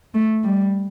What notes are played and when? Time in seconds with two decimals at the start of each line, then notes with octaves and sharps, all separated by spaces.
0.15 A3
0.44 G3